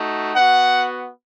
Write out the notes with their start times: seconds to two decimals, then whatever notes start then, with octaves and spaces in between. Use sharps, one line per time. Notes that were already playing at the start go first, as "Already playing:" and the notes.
Already playing: A3 D#4 F#4
0.35 B3 F#4 F#5